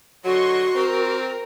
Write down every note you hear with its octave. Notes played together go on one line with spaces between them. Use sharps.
D3 F#3 F#4 D#5 C6 C#6
C4 A#4